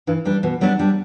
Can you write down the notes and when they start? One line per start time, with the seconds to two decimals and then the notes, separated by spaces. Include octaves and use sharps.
0.07 G2 E3
0.26 E3 G3 D4
0.43 B2 E3
0.61 F#3 G3 B3 D4
0.79 G3 D4